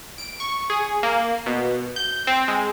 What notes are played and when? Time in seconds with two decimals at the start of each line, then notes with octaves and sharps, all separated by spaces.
0.18 D7
0.40 C#6
0.70 G#4
1.03 A#3
1.46 B2
1.96 G6
2.27 C4
2.48 G#3